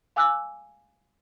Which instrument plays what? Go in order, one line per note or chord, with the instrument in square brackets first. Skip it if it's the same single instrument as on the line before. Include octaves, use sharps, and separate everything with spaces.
[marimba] F5 G#5 D6 E6 F#6